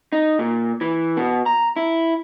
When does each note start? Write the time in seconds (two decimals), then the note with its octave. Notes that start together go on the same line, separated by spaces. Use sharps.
0.12 D#4
0.39 A#2
0.81 E3
1.17 B2
1.46 A#5
1.76 E4